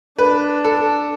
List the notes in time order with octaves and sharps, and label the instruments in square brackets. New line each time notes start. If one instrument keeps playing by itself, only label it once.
[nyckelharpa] D4 [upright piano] B4
[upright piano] A4